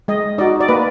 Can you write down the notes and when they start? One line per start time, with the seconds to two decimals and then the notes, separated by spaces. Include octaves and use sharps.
0.08 G#3 D#5
0.38 D#4 F#4 D5
0.60 D5
0.69 A#3 B4